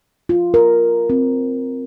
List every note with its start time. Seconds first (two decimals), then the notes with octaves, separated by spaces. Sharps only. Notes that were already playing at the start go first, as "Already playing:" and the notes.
0.29 F4
0.54 A#4
1.10 C4